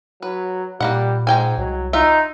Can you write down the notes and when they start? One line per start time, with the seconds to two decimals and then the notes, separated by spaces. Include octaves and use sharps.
0.22 F#3 B4
0.80 A#2 G3 A#3 E4 F#5
1.27 G#2 G#3 G5 G#5
1.58 C2 F#3
1.93 D#4 F4 E5